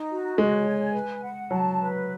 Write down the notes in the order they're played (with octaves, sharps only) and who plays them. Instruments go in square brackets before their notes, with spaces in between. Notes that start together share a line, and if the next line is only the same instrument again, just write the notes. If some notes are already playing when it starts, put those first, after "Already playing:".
Already playing: [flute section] D#4
F#4
[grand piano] G#3 [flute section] C#5
[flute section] G#5
B4
F#5
[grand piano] F#3 [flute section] A5
[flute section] B4